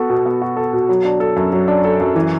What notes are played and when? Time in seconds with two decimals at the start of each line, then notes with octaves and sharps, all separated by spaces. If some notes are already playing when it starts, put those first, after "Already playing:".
Already playing: B3 F#4 A4
0.10 B2
0.26 B3
0.42 F#4
0.57 A4
0.73 B2
0.89 F#3
1.05 D4
1.20 A4
1.36 F#2
1.52 F#3
1.68 D4
1.85 A4
2.00 F#2
2.15 E3